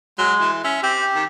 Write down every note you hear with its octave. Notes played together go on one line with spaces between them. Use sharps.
F#3 G#3
E3
C#4 E5
C4 G4
D#3